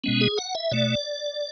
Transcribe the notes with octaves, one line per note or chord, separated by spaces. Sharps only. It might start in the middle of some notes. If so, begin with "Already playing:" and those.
B2 G#3 B3 C#4
G#4
F#5
E5
B2 A3 D5